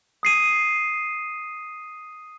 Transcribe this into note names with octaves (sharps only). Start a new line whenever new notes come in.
D#6 C7 D#7